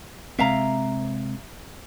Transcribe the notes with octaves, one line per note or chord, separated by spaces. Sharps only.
C3 G#3 C4 E5 F5 A#5